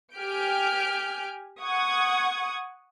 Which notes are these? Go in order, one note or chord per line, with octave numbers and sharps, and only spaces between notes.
G4 G#5 F6 G6 D7
F#5 C#6 D#6 G#6